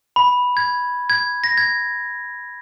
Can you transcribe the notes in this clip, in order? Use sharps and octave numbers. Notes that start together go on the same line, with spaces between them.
B5
G#6
G#6
A#6
G#6